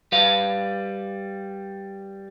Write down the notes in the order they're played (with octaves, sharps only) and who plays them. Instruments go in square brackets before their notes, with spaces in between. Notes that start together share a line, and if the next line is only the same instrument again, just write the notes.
[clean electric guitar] G3 B4 F5